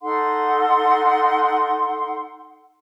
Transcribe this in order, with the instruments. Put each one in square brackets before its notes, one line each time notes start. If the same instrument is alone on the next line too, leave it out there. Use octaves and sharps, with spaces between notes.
[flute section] D#4 A4 F#5 C6